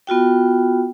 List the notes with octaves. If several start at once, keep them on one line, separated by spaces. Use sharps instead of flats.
B3 F4 F#4 G5